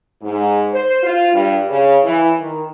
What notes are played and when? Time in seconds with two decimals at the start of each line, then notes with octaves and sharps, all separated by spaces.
0.22 G#2
0.72 C5
1.03 F4
1.33 G2
1.69 C#3
2.04 E3
2.39 D#3